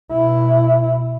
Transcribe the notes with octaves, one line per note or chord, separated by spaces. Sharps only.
B2 E4